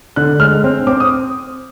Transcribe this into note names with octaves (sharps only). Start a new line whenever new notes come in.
D3 F#6
G#3 F6
C4
C4 D6
D#6